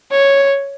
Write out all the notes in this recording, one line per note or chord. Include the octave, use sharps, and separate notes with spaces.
C#5